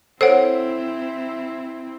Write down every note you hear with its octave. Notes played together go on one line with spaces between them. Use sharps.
C4 E4 A4 C5 C#5 F#5